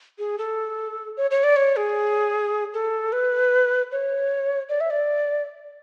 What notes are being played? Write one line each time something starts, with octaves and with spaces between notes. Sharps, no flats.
G#4
A4
C#5
C#5
D5
C#5
G#4
A4
B4
C#5
D5
E5
D5